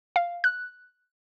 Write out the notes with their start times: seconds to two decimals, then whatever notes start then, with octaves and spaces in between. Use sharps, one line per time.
0.16 F5
0.44 F#6